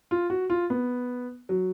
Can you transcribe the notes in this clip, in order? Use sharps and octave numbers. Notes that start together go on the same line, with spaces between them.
F4
F#4
F4
B3
F#3